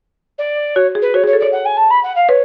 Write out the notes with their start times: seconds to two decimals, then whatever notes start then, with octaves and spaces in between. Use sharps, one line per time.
0.38 D5
0.75 F#4 C#5
0.95 G#4
1.02 B4
1.14 F#4 C#5
1.24 G#4
1.27 C#5
1.33 A4
1.40 C#5 D5
1.52 F#5
1.65 G#5
1.77 A5
1.90 B5
2.03 F#5
2.15 F5
2.29 B4 C#5